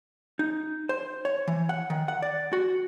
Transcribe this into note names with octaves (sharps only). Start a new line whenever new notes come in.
D#4
C5
C#5
E3
F#5
D#3
F#5
D5
F#4